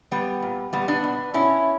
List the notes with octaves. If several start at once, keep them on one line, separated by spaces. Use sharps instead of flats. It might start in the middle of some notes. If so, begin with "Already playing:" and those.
A#2 G3 B3
A#2
A#2 G3 B3
B3 D4
B2
B2 C#4 E4